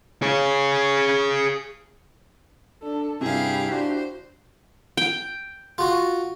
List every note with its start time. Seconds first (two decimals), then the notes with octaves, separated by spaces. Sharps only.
0.22 G#4 C#5
2.83 D4 A4
3.21 G2 C3 E4 G4 G#4 F5
3.71 D4 F#4 C5
4.97 G5
5.78 F4 F#4